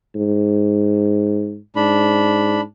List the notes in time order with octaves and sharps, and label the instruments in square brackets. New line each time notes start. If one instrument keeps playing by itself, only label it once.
[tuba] G#2
[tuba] G#2 [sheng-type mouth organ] D4 B5